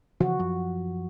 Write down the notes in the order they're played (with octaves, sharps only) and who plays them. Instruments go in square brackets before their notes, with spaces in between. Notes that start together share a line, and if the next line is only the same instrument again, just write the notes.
[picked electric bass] C#3 E3 F3 [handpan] F#4
[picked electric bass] F#2 F3